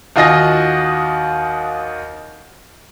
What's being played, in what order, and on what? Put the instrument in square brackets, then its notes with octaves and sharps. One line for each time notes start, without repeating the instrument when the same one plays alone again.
[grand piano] D#2 F4 F#4 D#5 G#5 A#6